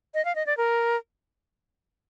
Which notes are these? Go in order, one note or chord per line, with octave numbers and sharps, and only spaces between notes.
D#5
F5
D#5
D5
A#4